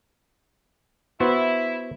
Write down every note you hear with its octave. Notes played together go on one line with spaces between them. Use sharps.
B3 E4 F#4 C5